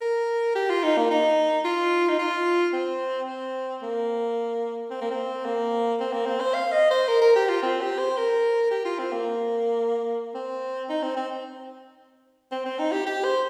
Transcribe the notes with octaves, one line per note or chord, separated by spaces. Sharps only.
A#4
G4
F4
D#4
A#3
D#4
F4
D#4
F4
C4
C4
A#3
C4
A#3
C4
A#3
C4
A#3
C4
C5
F5
D#5
C5
A#4
A#4
G4
F4
C4
G4
C5
A#4
G4
F4
C4
A#3
C4
D#4
C4
C4
C4
C4
D#4
G4
G4
C5